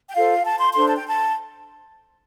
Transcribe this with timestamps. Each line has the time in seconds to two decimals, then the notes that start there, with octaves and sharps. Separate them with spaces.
0.09 G5
0.15 F4 A4 C5 F5
0.45 A5
0.59 C6
0.73 D4 A4 C5 C6
0.87 A5
0.96 G5
1.07 A5